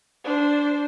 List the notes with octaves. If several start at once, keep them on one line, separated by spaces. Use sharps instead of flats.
D4 C5